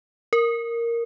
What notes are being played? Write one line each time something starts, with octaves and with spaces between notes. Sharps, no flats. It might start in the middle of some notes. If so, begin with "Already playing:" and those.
A#4